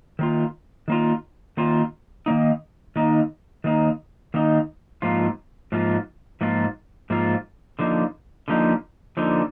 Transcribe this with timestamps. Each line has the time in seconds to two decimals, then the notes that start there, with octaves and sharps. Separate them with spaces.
0.19 D#3 A#3 F4
0.88 D#3 A#3 F4
1.57 D#3 A#3 F4
2.26 D#3 A#3 D#4
2.96 D#3 A#3 D#4
3.64 D#3 A#3 D#4
4.34 D#3 A#3 D#4
5.02 G#2 F3 A#3 F4
5.72 G#2 F3 A#3 F4
6.41 G#2 F3 A#3 F4
7.10 G#2 F3 A#3 F4
7.79 D3 F3 A#3 D#4
8.48 D3 F3 A#3 D#4
9.17 D3 F3 A#3 D#4